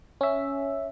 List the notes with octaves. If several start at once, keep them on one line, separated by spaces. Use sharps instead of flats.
C#4 E5